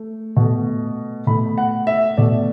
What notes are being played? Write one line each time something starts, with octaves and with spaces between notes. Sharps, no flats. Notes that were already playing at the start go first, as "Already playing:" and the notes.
Already playing: A3
B2 A3
B2 A3 B5
F#5
E5
B2 A3 D5